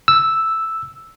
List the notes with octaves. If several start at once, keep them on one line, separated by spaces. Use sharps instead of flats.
E6